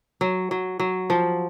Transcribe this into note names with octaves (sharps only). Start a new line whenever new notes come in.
F#3
F#3
F#3
F3